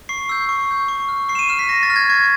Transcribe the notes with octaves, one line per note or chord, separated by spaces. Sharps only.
C#6 C7
E6 G6
C#6
E6 G6
C#6
F6
C#6 C7
E7
D#7
F6 E7
B6
C#6 A#6
A6
F6
G#6
C#6 G#6